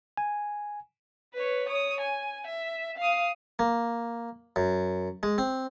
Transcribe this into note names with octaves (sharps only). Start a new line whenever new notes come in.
G#5
B4 C#5
C#5 D#6
G#5
E5
F5 D#6
A#3
F#2
G#3
C4